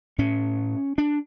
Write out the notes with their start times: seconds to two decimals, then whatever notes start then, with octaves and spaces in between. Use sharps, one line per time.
0.18 A2 C#4
0.98 D4